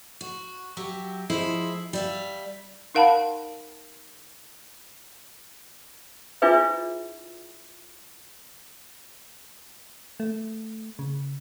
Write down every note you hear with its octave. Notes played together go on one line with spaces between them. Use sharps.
F#4
F#3 G4 E5
F3 G#3 E4 C5
G3 E5 F5
D#4 A#4 F5 F#5 A5 B5
D4 E4 F4 G#4 B4 E5
A3
C#3